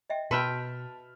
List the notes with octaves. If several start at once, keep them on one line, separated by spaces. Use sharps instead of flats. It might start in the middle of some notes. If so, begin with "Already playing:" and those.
D#5 E5 G5
B2 F#4 B4 E5 G5 A5 B5 F6